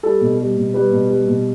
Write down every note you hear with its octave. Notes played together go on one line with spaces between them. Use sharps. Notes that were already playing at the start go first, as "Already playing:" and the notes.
G3 A4
B2
G3
B2
G3 B4
B2
G3
B2